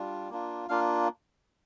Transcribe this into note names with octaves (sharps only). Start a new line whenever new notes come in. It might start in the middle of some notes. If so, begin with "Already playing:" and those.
Already playing: G3 D4 F4
A#3 D4 F4
A#3 D4 F4 F5